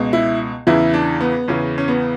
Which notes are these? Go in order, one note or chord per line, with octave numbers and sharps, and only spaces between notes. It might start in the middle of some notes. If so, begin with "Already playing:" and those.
Already playing: C#2 B2
E4
E2 C#3 E3 E4
D4
B3
E2 C#3 E3 C#4
C#4
B3